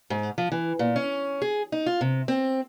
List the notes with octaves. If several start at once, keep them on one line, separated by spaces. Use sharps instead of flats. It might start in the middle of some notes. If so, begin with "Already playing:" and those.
G#2
F3
E3
A#2
C#4
G#4
D#4
F4
C3
C4